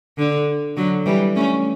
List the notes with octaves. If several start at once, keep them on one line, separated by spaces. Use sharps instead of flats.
D3
D3 F#3
E3 G3
A3 C#4